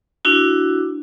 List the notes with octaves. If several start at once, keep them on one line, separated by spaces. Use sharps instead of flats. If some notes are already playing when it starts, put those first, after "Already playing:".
D4 E4 F#4